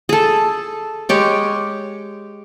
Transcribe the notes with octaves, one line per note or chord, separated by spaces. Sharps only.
G#4 A4
G#3 G4 C#5